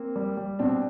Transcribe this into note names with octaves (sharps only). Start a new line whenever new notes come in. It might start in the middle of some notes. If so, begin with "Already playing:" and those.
Already playing: A#3 C4
G3
G3
B2 C4 D4